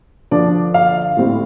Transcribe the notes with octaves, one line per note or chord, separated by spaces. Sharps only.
D3 F3 D4 D5
F5
A2 G3 C4